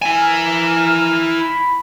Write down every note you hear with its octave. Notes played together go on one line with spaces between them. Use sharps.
E4 G#5
A#4
B5